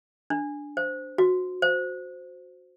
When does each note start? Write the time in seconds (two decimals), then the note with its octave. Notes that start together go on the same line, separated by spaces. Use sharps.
0.30 D4
0.77 C5
1.18 F#4
1.62 C5